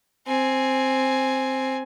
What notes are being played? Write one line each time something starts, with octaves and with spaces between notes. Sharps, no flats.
C4 G#5